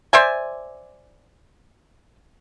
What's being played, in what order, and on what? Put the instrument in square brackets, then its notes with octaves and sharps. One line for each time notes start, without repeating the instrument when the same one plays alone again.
[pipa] C5 D5 E5 G#5